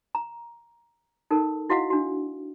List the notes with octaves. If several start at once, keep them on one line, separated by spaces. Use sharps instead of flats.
A#5
D#4 A4 A#4
E4 F#4 D#5 F5 F#5
D4 F#4